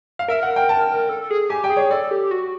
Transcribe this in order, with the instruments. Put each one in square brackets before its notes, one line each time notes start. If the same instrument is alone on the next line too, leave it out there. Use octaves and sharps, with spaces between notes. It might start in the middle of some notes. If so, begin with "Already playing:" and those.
[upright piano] F5
[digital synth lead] A#4 [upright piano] E5
[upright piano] F#5
G5
A5
[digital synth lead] A4
G#4
[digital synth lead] G4 [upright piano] G#5
[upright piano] G5
[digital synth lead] G#4
[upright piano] C#5
[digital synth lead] A4 [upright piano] D5
[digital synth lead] G4
F#4